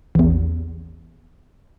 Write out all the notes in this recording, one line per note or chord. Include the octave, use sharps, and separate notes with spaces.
A1 E2